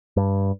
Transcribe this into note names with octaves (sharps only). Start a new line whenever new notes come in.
G2